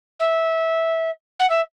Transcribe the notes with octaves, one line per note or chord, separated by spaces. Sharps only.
E5
F#5
E5